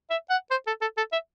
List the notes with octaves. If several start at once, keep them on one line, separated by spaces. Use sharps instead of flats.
E5
F#5
C5
A4
A4
A4
E5